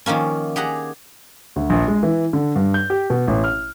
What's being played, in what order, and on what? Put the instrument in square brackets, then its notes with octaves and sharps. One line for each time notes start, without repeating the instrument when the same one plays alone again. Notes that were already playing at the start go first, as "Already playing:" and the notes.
[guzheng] D#3 F3 A#3 C#4
G4 G#4 F#5 A#5
[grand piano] D2
A#1
G#3
E3
D3
G2
G6
G4
B2
A1
F6